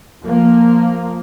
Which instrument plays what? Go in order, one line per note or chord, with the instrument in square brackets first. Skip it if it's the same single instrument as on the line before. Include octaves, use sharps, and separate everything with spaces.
[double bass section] F3 A#3